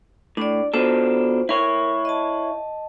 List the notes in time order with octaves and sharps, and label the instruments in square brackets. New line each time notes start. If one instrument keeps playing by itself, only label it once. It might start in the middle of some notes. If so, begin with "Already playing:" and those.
[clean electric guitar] A2 [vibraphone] D4 D5
[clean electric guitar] B2 D4 A4 [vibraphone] F4 C5
[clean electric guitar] E4 C#5 [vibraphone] A#4
[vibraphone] D#5 A5